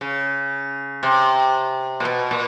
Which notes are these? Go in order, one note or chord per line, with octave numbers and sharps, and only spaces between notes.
C#3
C3
A#2
B2
A#2